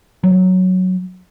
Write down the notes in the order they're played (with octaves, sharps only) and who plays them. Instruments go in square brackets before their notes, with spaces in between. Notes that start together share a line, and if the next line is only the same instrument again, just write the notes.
[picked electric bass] F#3